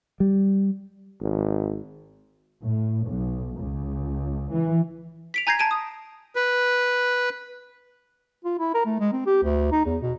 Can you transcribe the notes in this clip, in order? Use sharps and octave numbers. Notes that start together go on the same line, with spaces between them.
G3
G#1
A2
B1
C#2
E3
B6 D7 F7
G#5 A#5 G6 G#6 A#6 C7
A5 G#6 D7 D#7
D#6
B4
F4
E4
A#4
A3
G#3
C4
G4
D2
D#4
E2
B2